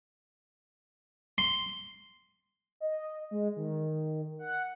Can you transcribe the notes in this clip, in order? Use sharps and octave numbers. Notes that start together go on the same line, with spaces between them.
C6
D#5
G#3
D#3
F#5